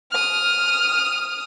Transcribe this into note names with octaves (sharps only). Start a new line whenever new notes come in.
D#6 F6